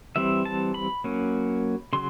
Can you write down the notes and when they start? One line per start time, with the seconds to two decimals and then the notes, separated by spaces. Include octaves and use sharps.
0.16 E3 G3 C4 E5
0.45 A5
0.74 B5
1.04 F#3 A#3 C#4
1.93 C#3 F#3 C6